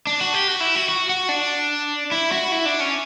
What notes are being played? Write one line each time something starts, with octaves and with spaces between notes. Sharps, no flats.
D4
F#4
G4
F#4
E4
F#4
F#4
F#4
D4
E4
F#4
E4
D4
C#4